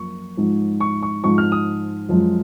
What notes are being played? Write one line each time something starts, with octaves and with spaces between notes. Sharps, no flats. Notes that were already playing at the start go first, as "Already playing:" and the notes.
Already playing: F#2 F3 A#3 C#6
G#2 F3 G#3
C#6
C#6
G#2 F3 G#3 C#6
F6
D#6
F#2 F3 G#3